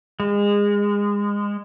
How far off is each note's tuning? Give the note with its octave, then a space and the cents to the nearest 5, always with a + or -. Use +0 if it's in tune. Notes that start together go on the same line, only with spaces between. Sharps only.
G#3 -25